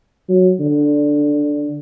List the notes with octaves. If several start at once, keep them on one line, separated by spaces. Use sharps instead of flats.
F#3
D3